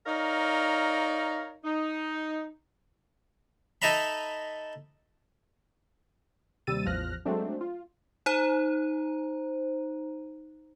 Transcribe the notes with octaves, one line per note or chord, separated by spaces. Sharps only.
D#4 A#4 C#5 D5 F5
D#4
D#4 A4 D#5 E5 A#5 B5
D#2 C3 G3 E6 A6 D#7
A1 E2 F3 F6 F#6 A#6
F#3 G#3 A3 C4 D4
F4
D#4 C5 A#5